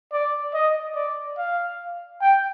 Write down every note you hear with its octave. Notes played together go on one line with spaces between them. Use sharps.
D5
D#5
D5
F5
G5